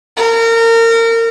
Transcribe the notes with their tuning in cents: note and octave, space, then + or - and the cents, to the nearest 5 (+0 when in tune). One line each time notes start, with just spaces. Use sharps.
A#4 -30